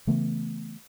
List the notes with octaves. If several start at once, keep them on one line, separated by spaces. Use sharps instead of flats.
C#3 E3 A3 B3